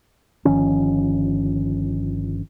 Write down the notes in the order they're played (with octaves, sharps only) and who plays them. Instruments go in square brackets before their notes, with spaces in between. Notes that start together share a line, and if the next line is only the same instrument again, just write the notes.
[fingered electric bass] G1 D#3 F3 C#4